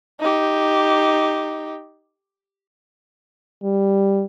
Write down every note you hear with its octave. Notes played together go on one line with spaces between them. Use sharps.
D#4 G4
G3